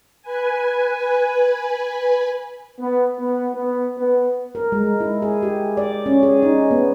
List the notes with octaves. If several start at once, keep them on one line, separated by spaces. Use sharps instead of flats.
B4 G#5
B3
B3
B3
B3
A#4
G#3
E4
G#4
G4
D5
C#4
G#4
D#4
B3